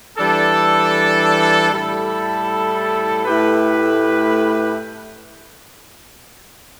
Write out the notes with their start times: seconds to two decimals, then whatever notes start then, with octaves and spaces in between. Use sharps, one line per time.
0.18 E3 G3 D4 A4
1.72 A2 G3 E4 A4
3.25 A2 A3 E4 G4 B4